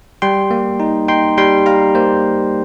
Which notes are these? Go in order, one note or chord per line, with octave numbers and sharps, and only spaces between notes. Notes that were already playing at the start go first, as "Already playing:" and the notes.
G3 G5 C6
A#3
D#4
D#4 G5 C6
G3 G5 C6
G3 F5 A#5
A#3 C5